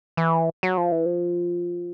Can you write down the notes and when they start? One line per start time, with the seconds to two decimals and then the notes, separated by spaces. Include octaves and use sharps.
0.17 E3
0.63 F#3
0.78 F3
0.92 E3
1.06 F3